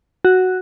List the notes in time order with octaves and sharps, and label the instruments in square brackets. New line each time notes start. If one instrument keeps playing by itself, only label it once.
[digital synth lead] F#4